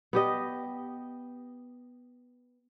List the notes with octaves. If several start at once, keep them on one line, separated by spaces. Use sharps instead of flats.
B3 G4 D#5